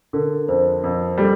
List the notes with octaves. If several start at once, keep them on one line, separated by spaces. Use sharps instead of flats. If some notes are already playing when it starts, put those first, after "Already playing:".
D3 A#4
F2 C5
F2
G3 A4